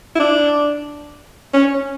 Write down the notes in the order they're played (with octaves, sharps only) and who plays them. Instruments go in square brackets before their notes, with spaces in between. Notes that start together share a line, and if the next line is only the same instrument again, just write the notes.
[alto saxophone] E4
D4
C#4